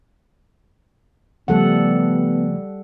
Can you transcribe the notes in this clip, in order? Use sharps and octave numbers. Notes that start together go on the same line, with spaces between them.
C#3 F3 G3 A3 B3 A4 F#5